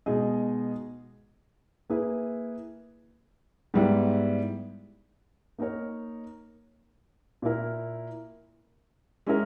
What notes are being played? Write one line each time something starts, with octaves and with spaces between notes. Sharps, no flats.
B2 G#3 D#4 G#4 D#5
A#3 E4 G#4 B4
G#2 G3 B3 E4
A#3 D#4 A#4 C#5
A#2 A#3 E4 A#4
G#3 C#4 E4 A#4